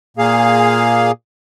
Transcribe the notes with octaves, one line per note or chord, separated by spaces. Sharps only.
A#2 A#3 G#4 F5